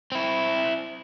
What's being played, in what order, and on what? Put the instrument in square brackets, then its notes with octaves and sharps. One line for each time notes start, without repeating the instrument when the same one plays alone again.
[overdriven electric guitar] C4 E4